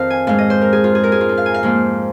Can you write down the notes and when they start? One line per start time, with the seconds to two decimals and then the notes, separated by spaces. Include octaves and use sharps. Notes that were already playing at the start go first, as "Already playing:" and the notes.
Already playing: F2 D#3 C5 D#5 F5
0.10 G#5
0.27 G#2 G#3 F5
0.39 D#5
0.50 C5
0.61 A#4
0.73 G#4
0.84 F4
0.95 G#4
1.04 A#4
1.12 G#4
1.21 F4
1.29 D#4
1.37 F5
1.46 G#5
1.54 F5
1.63 G#2 F3 A#3